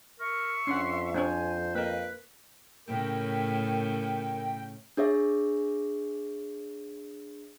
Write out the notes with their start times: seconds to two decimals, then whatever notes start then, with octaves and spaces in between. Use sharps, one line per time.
0.19 A#4 E5 C#6
0.67 F2 C#4 D4 F#5 C6
1.14 C4 D4 C5 C#5 G#5
1.75 A#3 A#4 B4 D#5 F5 G5
2.88 A2 C#3 A#4 G5
4.97 D4 G#4 C#5 E5